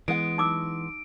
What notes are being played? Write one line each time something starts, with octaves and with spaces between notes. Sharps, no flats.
E3 G#3 B3 F#5 D7
D#4 D6 E6